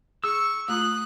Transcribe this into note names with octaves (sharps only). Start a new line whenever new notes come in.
G#4 C#6 E6
A3 F4 A#5 D#6 F#6